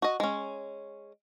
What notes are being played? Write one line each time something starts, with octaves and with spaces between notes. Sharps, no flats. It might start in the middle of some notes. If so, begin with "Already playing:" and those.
F#4 D#5
G#3 C#4